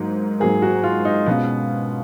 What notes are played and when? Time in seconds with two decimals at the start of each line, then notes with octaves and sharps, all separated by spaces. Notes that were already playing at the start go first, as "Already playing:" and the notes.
Already playing: G#2 F#3 A#3
0.40 G#2 F#3 A#3 G#4
0.62 F#4
0.84 F4
1.05 D#4
1.26 B2 G#3 B3 C#4 F4